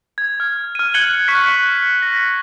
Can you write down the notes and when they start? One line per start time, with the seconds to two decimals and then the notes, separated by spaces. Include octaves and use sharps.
0.18 G#6
0.40 F6
0.75 F6 D#7
0.94 F#6 G#6 C#7 D#7 F#7 G7
1.28 C#6 F#6 B6 C#7
2.02 A#6